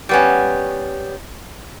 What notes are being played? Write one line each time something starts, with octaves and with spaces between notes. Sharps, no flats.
G3 B3 C#4